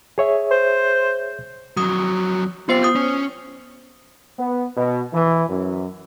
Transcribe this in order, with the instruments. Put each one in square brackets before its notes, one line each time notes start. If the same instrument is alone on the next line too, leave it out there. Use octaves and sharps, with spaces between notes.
[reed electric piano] G#4 C#5 E5
[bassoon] C5
[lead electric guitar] F2 F#3 [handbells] D#6
[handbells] B3 C5 C7 [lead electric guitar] F4 G4
[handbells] D#6 G6
[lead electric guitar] C#4
[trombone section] B3
B2
E3
F#2